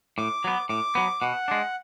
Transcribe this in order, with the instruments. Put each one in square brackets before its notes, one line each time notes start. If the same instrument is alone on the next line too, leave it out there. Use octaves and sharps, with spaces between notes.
[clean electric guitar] A2 [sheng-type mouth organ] D6
[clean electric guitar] F#3 B3
[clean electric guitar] A2 [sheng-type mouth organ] D6
[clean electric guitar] F#3 B3
[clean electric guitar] B2 [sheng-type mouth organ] F#5
[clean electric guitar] G#3 D4